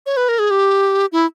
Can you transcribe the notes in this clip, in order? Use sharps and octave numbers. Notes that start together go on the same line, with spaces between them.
C#5
B4
A#4
G#4
G4
E4